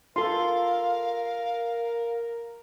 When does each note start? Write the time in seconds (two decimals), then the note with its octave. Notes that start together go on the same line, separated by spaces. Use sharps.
0.16 F4 A4 A#4 F5 C6